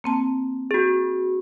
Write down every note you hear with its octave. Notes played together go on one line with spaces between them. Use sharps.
A#3 C4 A5
F#4 G#4